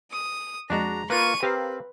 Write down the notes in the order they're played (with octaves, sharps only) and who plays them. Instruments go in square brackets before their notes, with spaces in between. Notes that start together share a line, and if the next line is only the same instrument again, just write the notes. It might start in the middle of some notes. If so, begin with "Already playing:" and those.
[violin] D#6
[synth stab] F2 G#3 [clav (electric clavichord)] D4 F#4 [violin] A#5
[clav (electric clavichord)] A#3 F4 [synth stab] B4 [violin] C#6 D#7
[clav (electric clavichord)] C4 [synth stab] G4 A#4 F5 [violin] B4